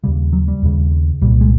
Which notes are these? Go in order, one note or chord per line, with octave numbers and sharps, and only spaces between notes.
D#2 C#3 G3
F#3
G3
D#2 C#3
C2 A#2 G3
G#3